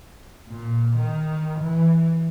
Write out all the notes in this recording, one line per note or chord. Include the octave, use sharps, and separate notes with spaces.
A#2
D#3
E3